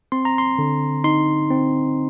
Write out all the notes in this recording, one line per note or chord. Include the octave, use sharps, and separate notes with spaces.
C4 C6
A#5
C6
D3
D#4 C6
C4